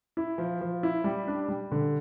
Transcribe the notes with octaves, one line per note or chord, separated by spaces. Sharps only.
E4
F3
F3
E4
G3
D4
G3
D3